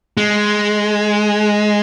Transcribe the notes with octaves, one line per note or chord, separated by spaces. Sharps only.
G#3